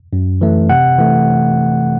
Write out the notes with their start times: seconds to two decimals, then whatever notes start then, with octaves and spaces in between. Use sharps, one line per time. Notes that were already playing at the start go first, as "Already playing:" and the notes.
0.13 F#2
0.41 E3 A3
0.70 C3 F#5
0.98 E3 A3